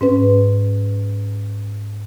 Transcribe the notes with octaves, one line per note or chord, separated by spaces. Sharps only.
G#2 C#4 B4